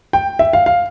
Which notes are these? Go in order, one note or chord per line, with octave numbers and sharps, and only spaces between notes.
G5
E5
F5
F5